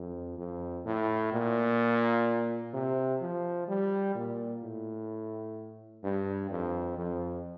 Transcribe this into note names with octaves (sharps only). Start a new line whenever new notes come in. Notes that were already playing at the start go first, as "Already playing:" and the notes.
Already playing: F2
F2
A2
A#2
C3
F3
G3
A#2
A2
G2
F2
F2